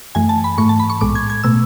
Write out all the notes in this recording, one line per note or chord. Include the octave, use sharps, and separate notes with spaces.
F#2 E3 A3 G#5
A5
B5
G#2 E3 A3 C#6
A5
B5
C#6
B1 A2 G#3 D6
G#6
G#6
B2 A3 E6